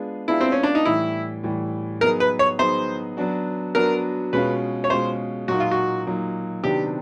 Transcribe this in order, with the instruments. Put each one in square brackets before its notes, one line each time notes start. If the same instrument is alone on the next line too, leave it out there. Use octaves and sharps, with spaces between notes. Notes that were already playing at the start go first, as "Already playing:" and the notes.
Already playing: [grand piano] G#3 B3 D4 F4 G#4
[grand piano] G#3 B3 D4 F4 G#4 [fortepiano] E4
[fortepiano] C4
C#4
D4
D#4
[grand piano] A2 E3 G3 [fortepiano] E4
[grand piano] A2 E3 G3
[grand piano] F#3 B3 D#4 G#4 [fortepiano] A#4
[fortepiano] B4
C#5
[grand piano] F#3 B3 D#4 G#4 [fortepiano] C5
[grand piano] F#3 B3 D4 F#4
[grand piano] F#3 B3 D4 F#4 [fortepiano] A#4
[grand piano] B2 G#3 C#4 F4 [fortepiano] B4
[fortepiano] C#5
[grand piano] B2 G#3 C#4 F4 [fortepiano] C5
[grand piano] A#2 F#3 A#3 D#4 [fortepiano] F#4
[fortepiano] F4
F#4
[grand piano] A#2 F#3 A#3 D#4
[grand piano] C3 D#3 F#3 B3 D4 [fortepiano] G4